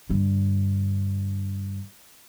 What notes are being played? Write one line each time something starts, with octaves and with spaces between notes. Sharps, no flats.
G2 D3